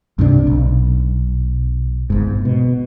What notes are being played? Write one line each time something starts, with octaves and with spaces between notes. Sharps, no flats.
C#2 G2 C3 D4
B1
G1 G#2
B2